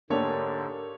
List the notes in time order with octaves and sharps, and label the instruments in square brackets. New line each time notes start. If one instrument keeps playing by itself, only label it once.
[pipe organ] G#2 D3 [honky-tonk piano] A#3 D4 [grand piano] G4 A4 C#5